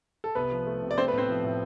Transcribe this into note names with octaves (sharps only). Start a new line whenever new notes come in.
A4
C2 B3 B4
F3
A3
C3
D5
A3 C4 C5
B3 B4
A2 C4 C5
F3
A2